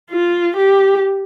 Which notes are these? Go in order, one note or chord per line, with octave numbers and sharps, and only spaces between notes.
F4
G4